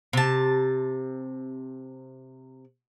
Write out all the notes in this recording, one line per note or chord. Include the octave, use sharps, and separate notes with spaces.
C3 A5